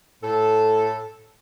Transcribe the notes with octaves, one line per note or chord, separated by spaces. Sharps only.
A2 A4